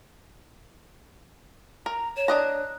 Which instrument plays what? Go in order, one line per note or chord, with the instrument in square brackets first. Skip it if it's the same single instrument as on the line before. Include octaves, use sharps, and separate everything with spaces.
[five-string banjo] A#4 [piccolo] A#5
[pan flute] C#5 [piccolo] E7
[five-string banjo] D4 D#5 A#5 [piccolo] F#6